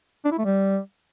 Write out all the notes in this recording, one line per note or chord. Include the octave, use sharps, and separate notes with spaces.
D4
E4
A3
G3